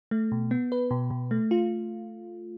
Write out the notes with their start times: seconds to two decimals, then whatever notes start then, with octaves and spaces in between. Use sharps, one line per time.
0.11 A3
0.32 B2
0.51 B3
0.72 B4
0.91 B2
1.11 B2
1.31 A3
1.51 F4